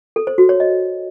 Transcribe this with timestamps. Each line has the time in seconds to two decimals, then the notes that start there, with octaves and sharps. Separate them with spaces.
0.16 A4
0.27 C5
0.38 F#4
0.49 C#5
0.60 D#5